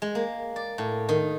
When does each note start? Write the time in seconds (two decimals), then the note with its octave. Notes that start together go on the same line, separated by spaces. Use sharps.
0.02 G#3
0.15 A#3
0.56 D5
0.78 A2
1.09 D#3